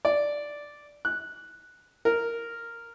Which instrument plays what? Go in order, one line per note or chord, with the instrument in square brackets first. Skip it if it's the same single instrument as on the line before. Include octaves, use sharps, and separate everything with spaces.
[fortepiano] D5
F#6
A#4